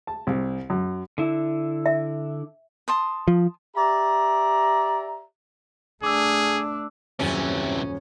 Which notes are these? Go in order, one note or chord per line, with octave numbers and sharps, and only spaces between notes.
A5
C2
F#2
D3 E4
E5
A5 C6 D#6
F3
G4 D5 E5 A#5
A3 D4 G#4 D6 E6
D#1 F#2 C3 E3 C#4 A6